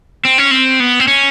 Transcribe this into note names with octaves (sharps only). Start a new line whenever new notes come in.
C4
C#4
C4
B3
C4
C#4